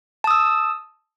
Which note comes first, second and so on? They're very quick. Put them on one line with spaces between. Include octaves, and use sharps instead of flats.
A5 D#6 E6